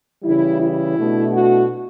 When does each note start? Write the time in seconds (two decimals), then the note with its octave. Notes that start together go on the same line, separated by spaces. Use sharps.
0.23 C#3 E3 G3 E4
0.60 E4
0.96 B2 A3 D4
1.32 F#4